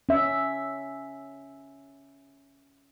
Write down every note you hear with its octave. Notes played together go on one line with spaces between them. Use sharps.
C#4 E5